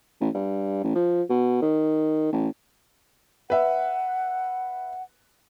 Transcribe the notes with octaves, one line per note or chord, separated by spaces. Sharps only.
A1
G2
A1
F3
B2
D#3
A1
B4 E5 F#5